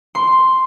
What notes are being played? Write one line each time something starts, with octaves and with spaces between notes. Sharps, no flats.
C6